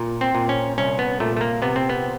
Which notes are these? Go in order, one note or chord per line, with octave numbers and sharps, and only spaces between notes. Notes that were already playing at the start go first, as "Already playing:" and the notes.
Already playing: A#2
C4
A#2
C#4
C2 C#4
B3
A#2 A3
A3
A#3
C3 B3
C4
B3